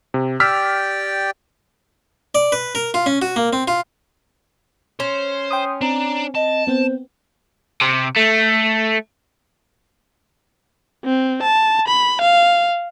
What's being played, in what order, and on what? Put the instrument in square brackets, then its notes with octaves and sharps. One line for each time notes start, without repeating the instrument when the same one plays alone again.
[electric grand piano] C3
[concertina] G4 D5 G5 [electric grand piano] E6 F6 B6
[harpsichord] D5
B4
A#4
F4
C#4
F#4
A#3
C4
F4
[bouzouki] C#4 [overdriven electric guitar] C5
[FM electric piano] G5 C6 D#6
[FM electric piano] C4 [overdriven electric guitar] D4 [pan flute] A#5
[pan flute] D#5 [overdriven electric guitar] A5
[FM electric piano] B3 C4 [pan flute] C5
[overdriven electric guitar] C3
A3
[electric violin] C4
A5
B5
F5